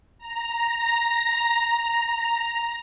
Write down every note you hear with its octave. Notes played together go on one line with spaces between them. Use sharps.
A#5 A#6